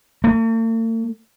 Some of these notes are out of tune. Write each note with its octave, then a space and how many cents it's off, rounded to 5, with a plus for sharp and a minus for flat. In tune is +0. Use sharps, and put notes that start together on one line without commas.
A3 +45